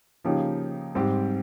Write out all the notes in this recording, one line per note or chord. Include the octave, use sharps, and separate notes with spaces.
C#3 F3 A#3 D#4 G4
G#2 G3 C4 G4